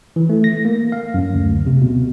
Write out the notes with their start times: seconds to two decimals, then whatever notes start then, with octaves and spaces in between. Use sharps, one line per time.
0.16 E3
0.29 A3
0.44 A#6
0.65 A#3
0.92 F5
1.14 F#2
1.34 D2
1.66 C3
1.81 B2